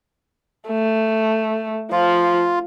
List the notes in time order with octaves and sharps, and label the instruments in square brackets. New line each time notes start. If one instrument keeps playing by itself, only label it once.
[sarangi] A3
[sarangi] F3 [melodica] F4